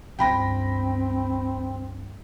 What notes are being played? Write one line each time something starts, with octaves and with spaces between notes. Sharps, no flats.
C#2 G2 C4 G5 B5 A#6